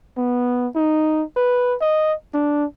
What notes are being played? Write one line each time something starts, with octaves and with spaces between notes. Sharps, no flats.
B3
D#4
B4
D#5
D4